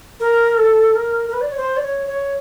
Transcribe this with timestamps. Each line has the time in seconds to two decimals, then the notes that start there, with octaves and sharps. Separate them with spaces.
0.20 A#4
0.58 A4
0.95 A#4
1.28 A#4
1.33 B4
1.41 D5
1.50 C#5
1.57 C5
1.77 D5
1.82 C#5
2.07 C#5